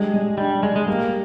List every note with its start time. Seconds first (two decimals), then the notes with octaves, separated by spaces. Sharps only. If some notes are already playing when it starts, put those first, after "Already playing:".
Already playing: G3 G#3 D4
0.14 G3
0.38 G3 D4
0.63 G#3 D4
0.76 G#3
0.88 G3 A#3